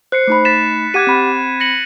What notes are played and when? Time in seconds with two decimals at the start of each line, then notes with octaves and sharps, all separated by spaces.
0.12 C5 F#6 C7 C#7
0.27 A3 D#4 B5
0.45 A6 B6 E7
0.94 G4 F#5 D6 F#6 G#6 D#7
1.07 C4 B5
1.60 A#6 C#7 F#7